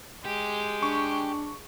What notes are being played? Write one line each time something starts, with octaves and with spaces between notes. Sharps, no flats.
G#3 G4
D4 C#6